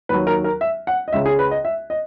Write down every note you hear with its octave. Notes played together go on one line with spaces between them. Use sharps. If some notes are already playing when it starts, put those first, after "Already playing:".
D#2 D#3 F#3 B4
A#4
A#4
E5
F#5
D#5
C#2 C#3 G#3 E5
G#4
B4
D#5
E5
D#5